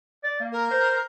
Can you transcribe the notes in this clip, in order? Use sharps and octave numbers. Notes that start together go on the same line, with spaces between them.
D5
A#3
A#4
C5